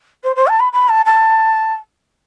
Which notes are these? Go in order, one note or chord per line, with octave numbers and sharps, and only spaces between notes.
C5
C5
A5
B5
B5
A5
A5